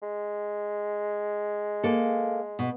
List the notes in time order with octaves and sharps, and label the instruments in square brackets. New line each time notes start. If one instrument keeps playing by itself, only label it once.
[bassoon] G#3
[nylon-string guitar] A#3 A4
B2